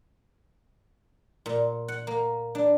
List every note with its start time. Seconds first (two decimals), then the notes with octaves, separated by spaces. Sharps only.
1.46 A#2
1.88 F#5
2.07 A#3
2.55 D4